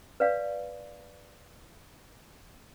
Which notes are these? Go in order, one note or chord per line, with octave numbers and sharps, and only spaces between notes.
B4 D5 F5